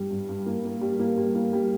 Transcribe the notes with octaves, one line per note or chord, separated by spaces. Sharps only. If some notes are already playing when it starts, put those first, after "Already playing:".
Already playing: G2 G3
G2
G2
A#3
A#3
G3
A#3
G3
A#3
G3